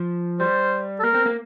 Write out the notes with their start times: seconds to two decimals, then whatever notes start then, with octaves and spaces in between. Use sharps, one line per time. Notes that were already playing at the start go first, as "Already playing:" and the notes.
Already playing: F3
0.40 G3 C5
0.99 A4
1.04 A#3 A#4
1.14 C4
1.26 A#3